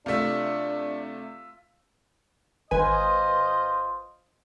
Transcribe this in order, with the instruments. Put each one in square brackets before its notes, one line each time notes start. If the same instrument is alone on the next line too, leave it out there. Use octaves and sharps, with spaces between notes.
[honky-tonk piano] C3 A3 [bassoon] D4 [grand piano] F4 E5
[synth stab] G#1 B4 G#5 [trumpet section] F4 C5 D#5